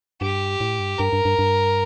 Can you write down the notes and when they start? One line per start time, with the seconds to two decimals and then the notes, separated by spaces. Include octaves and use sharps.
0.21 G2 G4
0.60 A2
0.79 G2
0.99 G2 A#4
1.13 G2
1.25 G2
1.39 G2